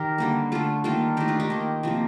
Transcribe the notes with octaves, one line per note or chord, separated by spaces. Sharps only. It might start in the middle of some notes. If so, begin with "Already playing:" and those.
Already playing: D#3 G4 A#4
D3 G3 A#3
D3 A3 F4 A4
D#3 G3 A#3 F4 A4
D#3 A3 D#4 G4
D4 F4
D#4 G4
D#3 A#3
C3 F3 A#3